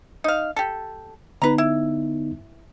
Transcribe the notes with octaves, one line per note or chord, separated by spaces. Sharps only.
D#4 F5
G4 A4
D3 B3 D#4 B4 A#5
E4